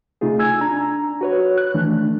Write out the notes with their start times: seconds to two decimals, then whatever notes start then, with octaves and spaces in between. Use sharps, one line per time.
0.21 C3 A3 D#4 F4 G#4
0.39 G#5 E6 G#6
0.61 D4 A#5
1.21 F#4 B4 C#5
1.58 F#6
1.74 D#3 E3 A3 D4